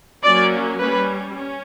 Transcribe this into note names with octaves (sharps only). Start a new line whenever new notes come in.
F#3 A#3 C#4 D5
G3 C#4 B4
C#4